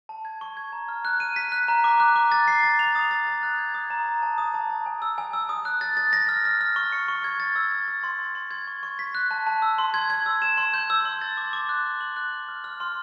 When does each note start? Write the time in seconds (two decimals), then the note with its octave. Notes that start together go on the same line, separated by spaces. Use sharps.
0.09 A5
0.25 G#6
0.41 C#6
0.57 G#6
0.73 A#5
0.89 F6
1.05 F#6
1.20 D#7
1.36 B6
1.52 F#6
1.68 A#5
1.84 D6
2.00 F#6
2.16 D6
2.32 A6
2.48 C7
2.63 A6
2.79 F7
2.95 D#6
3.11 A6
3.27 A6
3.43 F#6
3.58 G#6
3.74 D#6
3.90 A#5
4.06 A#5
4.22 A5
4.38 D#6
4.54 A5
4.70 A5
4.86 G#5
5.02 E6
5.18 G#5
5.33 E6
5.49 D#6
5.65 F#6
5.81 A6
5.97 A6
6.13 A#6
6.29 F6
6.45 A#6
6.61 F6
6.76 C#6
6.92 C#7
7.08 C#6
7.24 G#6
7.40 A6
7.56 E6
7.72 A6
7.88 A6
8.03 C6
8.19 C6
8.35 C6
8.51 G#6
8.67 C#6
8.83 C#6
8.99 B6
9.15 F#6
9.31 A5
9.47 A5
9.62 E6
9.78 C6
9.94 G#6
10.10 G#6
10.26 E6
10.42 E7
10.57 C6
10.74 G6
10.90 E6
11.05 C6
11.21 A6
11.37 D6
11.53 D6
11.69 F#6
11.85 F#6
12.01 F#7
12.16 F#6
12.32 F#6
12.48 F6
12.64 F6
12.80 C6